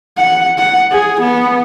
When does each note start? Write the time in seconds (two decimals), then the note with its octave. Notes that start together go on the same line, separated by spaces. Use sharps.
0.18 F#5
0.58 F#5
0.92 G#4
1.22 B3